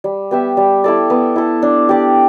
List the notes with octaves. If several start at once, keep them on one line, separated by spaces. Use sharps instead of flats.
G3
B3 G4 E5
G3
E4 A4 D5
B3
E4 A4
D4
G4 D5